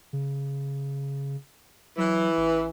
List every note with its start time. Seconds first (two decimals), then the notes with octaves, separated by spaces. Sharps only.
0.13 C#3
1.98 E3 F#3
2.37 A1